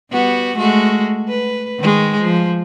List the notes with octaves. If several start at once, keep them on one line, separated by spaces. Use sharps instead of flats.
G3 B3 F#4
G#3 A3 F#4
B4
D#3 G#3
F3